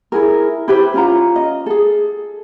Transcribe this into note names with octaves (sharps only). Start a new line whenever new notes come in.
E4 G#4 A#4
E4 G4 B4 C5
C#4 F4 A#5
D#5
G#4 A4